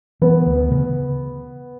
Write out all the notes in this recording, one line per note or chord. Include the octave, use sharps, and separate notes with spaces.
E3 B3
D2
C#3